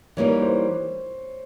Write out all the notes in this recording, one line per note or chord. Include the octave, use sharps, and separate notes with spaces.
E3 G3 A#3 D#4 C#5
C5